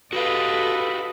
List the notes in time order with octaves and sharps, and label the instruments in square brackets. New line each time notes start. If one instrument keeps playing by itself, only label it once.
[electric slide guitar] F#4 G4 F5 [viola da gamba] A4 B4 D#5